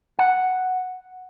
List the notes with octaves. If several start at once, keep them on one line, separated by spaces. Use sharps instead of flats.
F#5